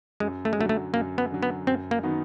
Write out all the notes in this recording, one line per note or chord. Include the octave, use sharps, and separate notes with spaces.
F#2 G#3
A3
G#3
D3 F#3 A3
A3
F#2 A#3
B3
D3 F#3
B3
F#2 C4
A#3
D#3 F#3 B3 D#4